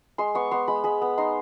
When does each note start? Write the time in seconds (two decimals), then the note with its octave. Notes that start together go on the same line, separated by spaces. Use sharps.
0.18 G#3 C6
0.35 B3 C#6
0.51 B3 C6
0.68 G#3 B5
0.84 G#3 B5
1.02 B3
1.18 D#4 C6